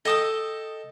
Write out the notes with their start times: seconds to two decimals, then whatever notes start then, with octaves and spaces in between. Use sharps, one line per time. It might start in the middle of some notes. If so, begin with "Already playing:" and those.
0.05 A4 D#5 G5 A5 D#6 E6